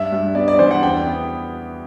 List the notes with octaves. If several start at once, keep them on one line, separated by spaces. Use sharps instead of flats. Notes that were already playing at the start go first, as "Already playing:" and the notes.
Already playing: G2 E5
G2
B3 D5
D5
E3 C5
F#5
E2 G5
B3